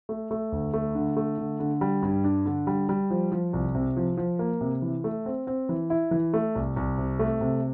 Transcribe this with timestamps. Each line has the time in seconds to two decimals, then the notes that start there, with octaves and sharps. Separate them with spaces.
0.09 A3
0.31 A3
0.52 D2
0.74 A3
0.95 D3
1.17 A3
1.38 D3
1.60 D3
1.81 G3
2.02 G2
2.24 D4
2.46 D3
2.67 G3
2.89 G3
3.10 F3
3.32 F3
3.53 C2
3.75 C3
3.97 F3
4.17 F3
4.39 A#3
4.61 C3
4.82 E3
5.04 A3
5.26 C4
5.47 C4
5.69 E3
5.90 E4
6.11 E3
6.34 A3
6.55 C2
6.76 C2
6.98 C3
7.19 A3
7.41 C3